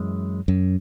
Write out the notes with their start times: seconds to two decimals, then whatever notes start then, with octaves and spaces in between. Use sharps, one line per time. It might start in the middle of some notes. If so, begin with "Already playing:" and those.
Already playing: F#2 E3 G#3
0.48 F#2